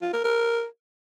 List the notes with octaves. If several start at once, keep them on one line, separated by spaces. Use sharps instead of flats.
F4
A#4
A#4